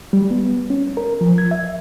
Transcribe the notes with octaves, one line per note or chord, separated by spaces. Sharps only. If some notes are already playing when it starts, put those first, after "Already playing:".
G3
B3
C#4
A#4
F3
G#6
E5